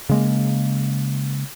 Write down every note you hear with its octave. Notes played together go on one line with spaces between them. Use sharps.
C#3 G#3 A#3